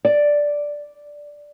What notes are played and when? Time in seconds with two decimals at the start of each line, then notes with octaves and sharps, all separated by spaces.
0.05 D5